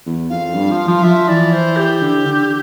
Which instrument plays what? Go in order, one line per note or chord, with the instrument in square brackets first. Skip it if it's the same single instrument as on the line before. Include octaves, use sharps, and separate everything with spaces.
[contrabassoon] E2
[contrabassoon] F2 [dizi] F5
[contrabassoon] G2
F3
F3
[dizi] F5
[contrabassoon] F3 [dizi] E5
[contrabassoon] E3 [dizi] D5
[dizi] C5
G4
[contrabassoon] D3
D3